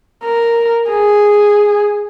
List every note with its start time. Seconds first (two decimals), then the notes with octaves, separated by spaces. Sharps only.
0.25 A#4
0.90 G#4